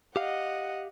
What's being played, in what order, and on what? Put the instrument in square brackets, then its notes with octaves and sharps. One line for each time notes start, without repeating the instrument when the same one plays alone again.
[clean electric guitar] G4 F5 [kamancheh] D#5 F#5